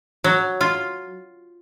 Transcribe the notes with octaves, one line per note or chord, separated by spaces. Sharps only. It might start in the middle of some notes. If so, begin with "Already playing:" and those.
F#3
F4